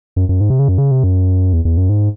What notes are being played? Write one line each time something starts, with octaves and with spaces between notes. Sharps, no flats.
F#2
F#2
G#2
C3
C#3
F#2
C#3
C3
F#2
E2
E2
F#2
G#2